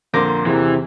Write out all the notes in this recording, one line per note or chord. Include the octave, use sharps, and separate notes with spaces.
F2 A#2 D3 A#4 C5 D6
E2 C3 E3 G#4